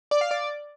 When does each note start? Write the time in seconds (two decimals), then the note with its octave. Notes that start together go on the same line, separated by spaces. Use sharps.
0.11 D5
0.21 F5
0.31 D5